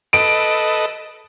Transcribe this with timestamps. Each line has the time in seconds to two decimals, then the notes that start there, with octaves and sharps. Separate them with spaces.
0.13 A4 B4 D#5 D7